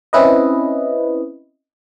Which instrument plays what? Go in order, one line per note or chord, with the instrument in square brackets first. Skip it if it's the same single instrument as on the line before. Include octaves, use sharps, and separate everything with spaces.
[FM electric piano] C4 C#4 E4 B4 D#5